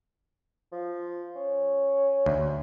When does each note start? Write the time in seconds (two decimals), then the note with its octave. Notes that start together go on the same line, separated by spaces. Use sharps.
0.72 F3
1.36 C#4
2.26 D2